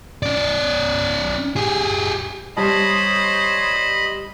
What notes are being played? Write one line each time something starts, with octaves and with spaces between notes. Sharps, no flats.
C#4 D5
G4 G#4
G3 C5 C#5 D#5 A5 B5 D#6